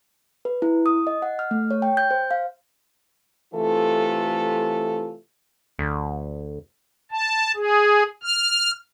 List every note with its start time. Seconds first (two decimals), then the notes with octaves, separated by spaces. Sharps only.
0.45 B4
0.62 E4
0.86 D#6
1.07 D#5
1.22 F#5
1.39 F6
1.51 A3
1.71 C#5
1.82 G5
1.97 G6
2.11 C5
2.31 F5
3.54 C3 E3 A3 F4 A4
5.79 D2
7.11 A5
7.56 G#4
8.23 F6